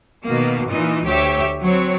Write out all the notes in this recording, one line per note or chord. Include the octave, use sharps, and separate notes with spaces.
B2 D#3 A#3
A#2 E3 D#4
D2 G4 C#5 E5
F#3 C4 C#5